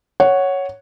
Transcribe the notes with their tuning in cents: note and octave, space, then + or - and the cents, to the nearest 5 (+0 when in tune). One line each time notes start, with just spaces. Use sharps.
C#5 +0 F#5 +0